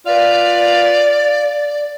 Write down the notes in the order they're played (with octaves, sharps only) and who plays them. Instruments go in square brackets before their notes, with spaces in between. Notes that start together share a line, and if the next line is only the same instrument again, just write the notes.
[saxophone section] F4 B4 F5 [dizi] D5